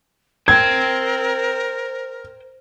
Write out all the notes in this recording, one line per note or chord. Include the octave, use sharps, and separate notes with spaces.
A#4 C5 G5 G#6